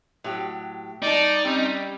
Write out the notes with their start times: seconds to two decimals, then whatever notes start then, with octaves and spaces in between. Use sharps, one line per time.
0.24 A2 F#3 G4
1.02 G3 D#4 D5 D#5 A5
1.45 G3 C4 C#4